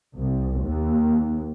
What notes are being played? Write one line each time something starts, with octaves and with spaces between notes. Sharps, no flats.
C2
D#2